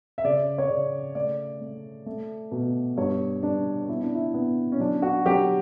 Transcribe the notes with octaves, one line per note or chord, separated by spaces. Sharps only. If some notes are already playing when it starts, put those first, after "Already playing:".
E5
C#3 D5
C#5
C#3 D5
A3 D5
A3
A3
B2
G2 C#5
G2 D4
B3 E4
D4
E4
B3
C#4
F#3 D4
F#4
F#3 G4